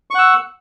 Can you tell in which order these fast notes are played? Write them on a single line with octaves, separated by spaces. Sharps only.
C#6 F#5 E6